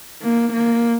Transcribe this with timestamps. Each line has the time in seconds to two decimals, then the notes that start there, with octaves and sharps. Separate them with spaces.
0.22 A#3
0.53 A#3